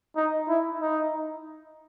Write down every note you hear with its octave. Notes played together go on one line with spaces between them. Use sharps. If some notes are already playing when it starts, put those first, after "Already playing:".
D#4
E4
D#4